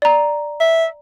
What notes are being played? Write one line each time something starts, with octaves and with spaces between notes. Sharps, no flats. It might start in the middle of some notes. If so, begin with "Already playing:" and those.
D5 A#5
E5